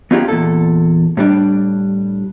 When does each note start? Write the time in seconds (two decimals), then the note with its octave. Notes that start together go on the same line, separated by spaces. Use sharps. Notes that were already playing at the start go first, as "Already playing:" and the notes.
0.11 B3 C#4 D#4 F4 G4 G#4
0.28 E2 A#2 A4
1.17 A2 G3 D4